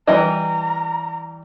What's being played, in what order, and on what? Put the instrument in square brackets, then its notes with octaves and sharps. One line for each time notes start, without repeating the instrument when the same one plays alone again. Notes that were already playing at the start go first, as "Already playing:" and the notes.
[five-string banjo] E3 G3 D#5 [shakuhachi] A#5